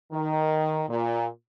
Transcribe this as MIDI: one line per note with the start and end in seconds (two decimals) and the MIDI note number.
0.12 0.83 51
0.90 1.27 46